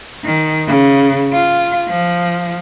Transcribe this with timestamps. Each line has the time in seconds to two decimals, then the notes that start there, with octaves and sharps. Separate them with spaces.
0.24 D#3
0.67 C#3
1.33 F4
1.89 F3